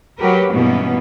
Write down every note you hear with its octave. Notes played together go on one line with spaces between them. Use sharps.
F#3 F#4 G4 A#4 B4
G2 B2 E3 A#3 B3 C#4